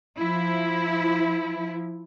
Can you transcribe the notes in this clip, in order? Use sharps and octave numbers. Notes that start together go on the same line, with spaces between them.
F3 E4